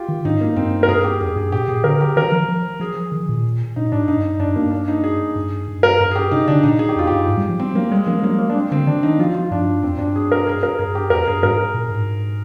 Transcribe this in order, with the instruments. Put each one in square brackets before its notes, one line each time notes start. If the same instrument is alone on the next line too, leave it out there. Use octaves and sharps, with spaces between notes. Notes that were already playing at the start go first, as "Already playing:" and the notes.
Already playing: [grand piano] F4 G4
[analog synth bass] D#3
[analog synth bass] G#2 [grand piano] D#4
[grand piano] A#3
[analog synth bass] G2 [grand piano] C4
[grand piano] A#4
[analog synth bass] G2 [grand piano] G#4
[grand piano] G4
[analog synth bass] F2 [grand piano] G#4
[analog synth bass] G2 [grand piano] G#4
[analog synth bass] A#2 [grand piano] G4
[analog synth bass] A#2 [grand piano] G#4
[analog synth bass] D3 [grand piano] A#4
[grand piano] G4
[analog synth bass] D#3 [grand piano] A#4
[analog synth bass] F3
F3
[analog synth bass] F3 [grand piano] G#4
[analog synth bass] D#3
A#2
[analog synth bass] A#2 [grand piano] D#4
[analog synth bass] G#2 [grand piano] D4
[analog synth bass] G2 [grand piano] D#4
[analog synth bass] G2 [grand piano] D4
[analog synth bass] G2 [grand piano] A#3
[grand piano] D4
D#4
G#4
[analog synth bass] G2
G2
[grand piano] A#4
[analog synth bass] G2
[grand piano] G#4
G4
[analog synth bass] C3 [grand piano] D#4
[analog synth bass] D3 [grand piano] D4
[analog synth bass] A#2 [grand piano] D#4
[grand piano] G#4
G4
[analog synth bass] F2 [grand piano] F4
[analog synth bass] G2 [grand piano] G4
[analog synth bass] G#2
G3
F3
[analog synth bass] G3 [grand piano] C4
[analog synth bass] G3 [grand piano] A#3
[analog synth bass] G3 [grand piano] G#3
[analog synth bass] F3 [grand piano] A#3
[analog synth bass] G3 [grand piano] A#3
[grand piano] A#3
D4
C4
[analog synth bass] D3 [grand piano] C4
[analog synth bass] D#3 [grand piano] D4
[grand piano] D#4
[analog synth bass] F3 [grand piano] F4
[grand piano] F4
[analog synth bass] G2 [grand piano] D4
[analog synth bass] F2 [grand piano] C4
[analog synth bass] G2 [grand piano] D4
[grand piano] G#4
A#4
G#4
A#4
[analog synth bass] G2 [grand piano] G#4
[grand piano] G4
[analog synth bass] F2 [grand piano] A#4
[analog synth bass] G2 [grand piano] G#4
[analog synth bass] G#2 [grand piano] A#4
[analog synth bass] A#2
G#2